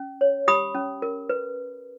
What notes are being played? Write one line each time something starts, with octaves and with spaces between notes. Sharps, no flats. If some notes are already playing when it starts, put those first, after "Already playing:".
Already playing: C#4
C#5
G4 B5 D#6
C#4
A#4
B4